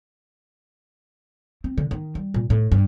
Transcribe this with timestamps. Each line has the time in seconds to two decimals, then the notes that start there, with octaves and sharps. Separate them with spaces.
1.64 C4
1.78 D3
1.91 D#3
2.15 G3
2.34 A#2
2.50 A2
2.72 G2